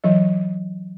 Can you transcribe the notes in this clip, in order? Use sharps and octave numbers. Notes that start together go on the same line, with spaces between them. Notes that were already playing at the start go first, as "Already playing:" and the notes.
E3 F#3 D#5